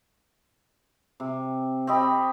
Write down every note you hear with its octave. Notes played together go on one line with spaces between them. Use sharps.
C3
C4 G4 D#5 B5